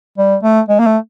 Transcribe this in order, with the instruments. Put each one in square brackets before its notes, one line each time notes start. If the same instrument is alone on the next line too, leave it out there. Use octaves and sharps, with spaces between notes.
[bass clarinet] G3
A3
G#3
A#3
A3